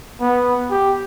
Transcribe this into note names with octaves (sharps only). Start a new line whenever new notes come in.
B3
G4